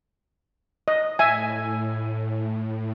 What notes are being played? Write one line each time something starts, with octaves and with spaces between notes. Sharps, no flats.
D#5
A2 E5 G#5